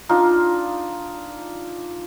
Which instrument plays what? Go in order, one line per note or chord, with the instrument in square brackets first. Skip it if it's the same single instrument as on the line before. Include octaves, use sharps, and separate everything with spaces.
[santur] D4 D#4 F4